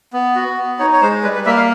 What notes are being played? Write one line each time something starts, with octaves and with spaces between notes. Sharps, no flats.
B3
F#4
B3
D#4 C#5
C#5
G#3 C5
G3 B4
B4
A#3 E5
F5